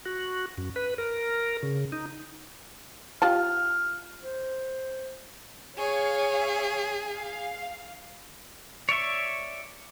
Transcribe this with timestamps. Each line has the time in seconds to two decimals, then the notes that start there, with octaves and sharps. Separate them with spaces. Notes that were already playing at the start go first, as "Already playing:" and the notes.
0.06 F#4
0.58 F#2
0.76 B4
0.98 A#4
1.63 C#3
1.92 D#4
3.22 F4 G4 A5 F6
4.23 C5
5.78 G#4 C#5 F5
7.12 F5
8.89 C#5 D5 E5 C#6